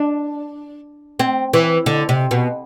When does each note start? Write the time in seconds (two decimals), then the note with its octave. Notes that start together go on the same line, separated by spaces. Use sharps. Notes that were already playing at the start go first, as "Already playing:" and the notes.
Already playing: D4
1.19 C4
1.53 E3
1.86 D3
2.09 C3
2.31 B2